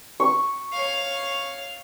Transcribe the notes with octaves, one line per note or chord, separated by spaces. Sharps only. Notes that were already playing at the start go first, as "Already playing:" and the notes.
C#6
C#5 F5